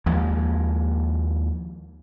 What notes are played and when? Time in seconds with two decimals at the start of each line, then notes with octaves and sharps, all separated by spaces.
0.06 D#2 F3 G#3 A#3